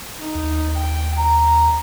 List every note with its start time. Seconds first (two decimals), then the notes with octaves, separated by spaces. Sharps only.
0.19 D#4
0.35 D#2
0.75 G5
1.17 A#5